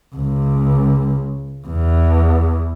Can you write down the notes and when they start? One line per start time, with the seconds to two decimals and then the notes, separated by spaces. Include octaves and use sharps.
0.15 C#2
1.67 E2